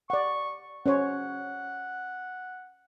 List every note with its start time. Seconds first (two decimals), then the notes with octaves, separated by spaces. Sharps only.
0.10 D5 F#5 C#6
0.86 C#4 C5 C#5 F#5